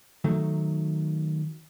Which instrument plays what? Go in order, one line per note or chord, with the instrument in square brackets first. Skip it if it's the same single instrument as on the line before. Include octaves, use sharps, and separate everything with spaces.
[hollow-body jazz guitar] D#3 F#3 A3